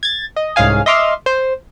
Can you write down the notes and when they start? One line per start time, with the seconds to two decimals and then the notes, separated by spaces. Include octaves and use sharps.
0.03 G#6 A6
0.36 D#5
0.56 C2 G#2 C#4 G#4 F5 G#5
0.86 D#5 E5 C6 D6 F6
1.26 C5